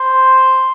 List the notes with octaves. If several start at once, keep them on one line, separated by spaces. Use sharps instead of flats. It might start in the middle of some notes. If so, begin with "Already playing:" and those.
Already playing: C5